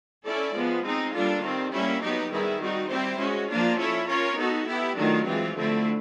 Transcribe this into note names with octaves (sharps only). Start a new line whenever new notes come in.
C#4 E4 A4 D5
F3 G#3 B3
G#3 C4 D#4
G3 A#3 D4 F4 A4
D#3 G3 C4
G3 A#3 C#4 E4
F#3 B3 D#4 G4
D#3 G3 B3 E4 G#4
G3 C4 D#4 F#4
G3 C4 E4 G4 C5
G#3 C#4 F#4
F3 A#3 D4 F4
C#4 E4 A4 C#5
C#4 F4 A#4 C#5
B3 D#4 F#4 A4
B3 E4 G4
D#3 F#3 A3 D4 F4
E3 G#3 C4 F4
D3 F3 A3 C4 E4